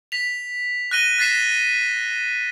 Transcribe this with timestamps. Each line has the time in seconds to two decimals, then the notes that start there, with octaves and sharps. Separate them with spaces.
0.12 B6 F7
0.91 F#6 A#6 D#7 G7
1.18 F#6 A6 B6 C7 E7